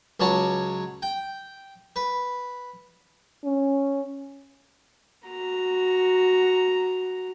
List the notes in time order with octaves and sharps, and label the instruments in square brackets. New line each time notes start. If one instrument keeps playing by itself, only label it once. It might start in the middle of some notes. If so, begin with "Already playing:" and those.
[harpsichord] C#2 F#3 C#5 A5
G5
B4
[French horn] C#4
[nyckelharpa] F#4 A#5